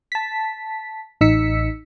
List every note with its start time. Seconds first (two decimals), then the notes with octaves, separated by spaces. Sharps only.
0.12 A5 B6
1.21 A1 D#4 E6 B6 C#7